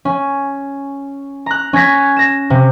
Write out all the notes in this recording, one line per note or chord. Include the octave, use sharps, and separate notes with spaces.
C#4
A#5 F#6
C#4 G#6 A#6 B6
A#6 E7
C3